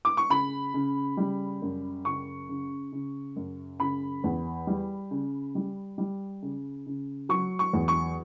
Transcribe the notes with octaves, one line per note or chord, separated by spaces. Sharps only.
D6
C#6
C#3 B5
C#3
G3
F#2
C#3 C#6
C#3
C#3
F#2
C#3 B5
E2
G3
C#3
G3
G3
C#3
C#3
F#3 C#6
C#6
E2
C#6